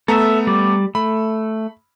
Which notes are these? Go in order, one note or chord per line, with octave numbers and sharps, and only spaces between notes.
A3 B3 A4 E5 A#5
G3 D5
A3 B5